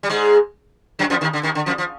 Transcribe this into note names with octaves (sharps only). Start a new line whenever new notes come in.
G3
G#2 G#3
F#2 F#3
F2 F3
D#2 D#3
D3
D#2 D#3
D3
F2 F3
F3